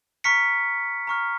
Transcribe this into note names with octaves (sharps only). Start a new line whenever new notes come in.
A#5 C#6 F6 B6 C#7
A#5 C#6 F6